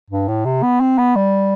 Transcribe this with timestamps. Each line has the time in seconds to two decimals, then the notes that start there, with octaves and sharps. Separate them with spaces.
0.10 G2
0.28 A2
0.45 C3
0.63 B3
0.80 C4
0.98 B3
1.16 G3